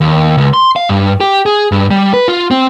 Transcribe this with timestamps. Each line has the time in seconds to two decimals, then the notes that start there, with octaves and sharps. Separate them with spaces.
0.01 D#2
0.37 C#2
0.54 C6
0.76 F5
0.89 G2
1.21 G4
1.46 G#4
1.72 G2
1.91 G3
2.14 B4
2.28 F4
2.51 C4